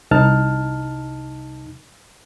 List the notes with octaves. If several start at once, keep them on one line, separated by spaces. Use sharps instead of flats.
C2 D#4 A5 F6